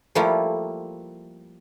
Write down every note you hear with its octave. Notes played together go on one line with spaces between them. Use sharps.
F3 G3 A3 A#3 E4 F4